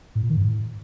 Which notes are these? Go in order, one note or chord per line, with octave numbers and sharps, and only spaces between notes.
A2
A#2
D#3
G2
A2